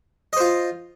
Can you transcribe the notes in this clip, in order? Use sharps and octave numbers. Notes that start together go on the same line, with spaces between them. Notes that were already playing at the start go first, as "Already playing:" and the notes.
F4 C5 D#5